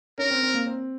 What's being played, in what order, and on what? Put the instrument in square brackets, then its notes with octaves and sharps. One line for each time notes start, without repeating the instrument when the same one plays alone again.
[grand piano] C#4 [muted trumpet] A#4
[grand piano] C4
C4
A#3
C4